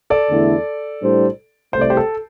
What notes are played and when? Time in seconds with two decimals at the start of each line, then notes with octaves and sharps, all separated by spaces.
0.10 A4 D5
0.29 E2 D3 A3 E4
1.01 A2 G3 D4 C5
1.73 C2 C3 A3 C5
1.81 D5
1.90 G4 C5
1.97 A4